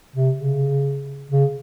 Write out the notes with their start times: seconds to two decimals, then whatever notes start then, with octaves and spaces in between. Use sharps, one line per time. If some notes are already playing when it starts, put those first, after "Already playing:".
0.16 C3
0.36 C#3
1.32 C#3